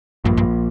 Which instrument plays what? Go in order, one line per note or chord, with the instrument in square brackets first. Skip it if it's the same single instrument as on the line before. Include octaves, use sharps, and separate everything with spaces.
[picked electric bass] A#1 A#2 [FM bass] G2
[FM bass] G2